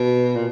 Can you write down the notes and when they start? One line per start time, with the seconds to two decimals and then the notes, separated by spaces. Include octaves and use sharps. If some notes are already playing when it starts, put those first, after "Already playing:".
Already playing: B2
0.36 A#2